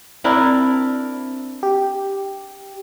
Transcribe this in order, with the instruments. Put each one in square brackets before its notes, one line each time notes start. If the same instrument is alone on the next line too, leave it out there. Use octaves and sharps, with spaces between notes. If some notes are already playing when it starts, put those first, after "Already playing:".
[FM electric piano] C4 [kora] D4 E4 A#4
[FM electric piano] G4